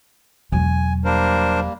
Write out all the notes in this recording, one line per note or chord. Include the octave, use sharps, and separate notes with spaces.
E1 F#3 G#5
G3 A#3 D4 A#4 C5